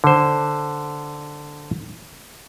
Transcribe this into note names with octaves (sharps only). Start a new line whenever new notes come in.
D3 C5